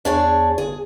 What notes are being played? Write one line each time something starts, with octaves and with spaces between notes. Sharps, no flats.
E2 D4 G#4 C#5
G1 G#4